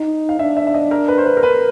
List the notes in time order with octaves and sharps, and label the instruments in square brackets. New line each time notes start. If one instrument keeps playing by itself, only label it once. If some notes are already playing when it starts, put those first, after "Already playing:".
Already playing: [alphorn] D#4
[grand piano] F5
[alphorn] D4 [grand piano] E5
[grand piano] E5
E5
D#5
A#4
B4
C5
B4
A#4
B4